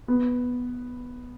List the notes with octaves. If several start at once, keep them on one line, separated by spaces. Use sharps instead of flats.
B3